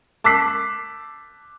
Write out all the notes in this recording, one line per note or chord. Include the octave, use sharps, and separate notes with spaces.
A5 D6 E6 F#6 B6 C7